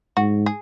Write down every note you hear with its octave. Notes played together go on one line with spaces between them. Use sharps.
G#2 F#4
G#4